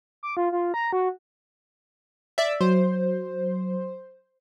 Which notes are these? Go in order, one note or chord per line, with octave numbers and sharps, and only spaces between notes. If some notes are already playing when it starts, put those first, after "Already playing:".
D6
F4
F4
A#5
F#4
D5 E5
F#3 C5